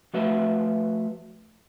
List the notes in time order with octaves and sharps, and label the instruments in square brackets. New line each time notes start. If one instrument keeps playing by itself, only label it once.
[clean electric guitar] F3 A3 F#4 B4 E5 F5